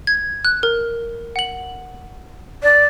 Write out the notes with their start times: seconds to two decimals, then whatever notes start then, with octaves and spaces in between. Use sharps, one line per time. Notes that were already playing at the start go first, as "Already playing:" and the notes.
0.07 G#6
0.45 F#6
0.63 A#4
1.36 F#5 F#7
2.63 D5